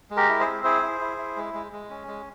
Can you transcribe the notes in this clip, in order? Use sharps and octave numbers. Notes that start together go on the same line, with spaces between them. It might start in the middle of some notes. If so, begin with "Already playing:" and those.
G#3
G4 A#4
E4
G#4 C5
C4
E4 G#4 C5
E4
E4
E4
G#3
G#3
G#3
C#4
G#3